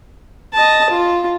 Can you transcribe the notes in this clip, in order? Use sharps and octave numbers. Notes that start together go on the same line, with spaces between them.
D#5 A5
F4